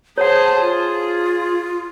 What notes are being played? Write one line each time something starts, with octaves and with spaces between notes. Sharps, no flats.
G#4 C5 C#5 F#5 A5
F4 G#4